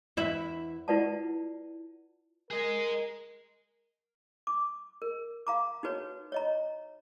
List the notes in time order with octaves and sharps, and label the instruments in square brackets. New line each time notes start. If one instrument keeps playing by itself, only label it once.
[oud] E2 E4 E5
[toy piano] E4 F4 B4 D5 F#5 A5
[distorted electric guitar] G#4 D#5 [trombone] A#4
[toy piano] D6
A#4
F5 A#5 D6
D#4 F#4 B4 C#5
C#5 D#5 A#5